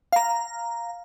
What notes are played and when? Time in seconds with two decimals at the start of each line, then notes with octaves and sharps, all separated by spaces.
0.13 F5 A#5